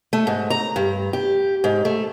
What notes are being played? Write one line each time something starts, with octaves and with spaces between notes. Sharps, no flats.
A3
G#2
A#5
G2
G4
G#2
A3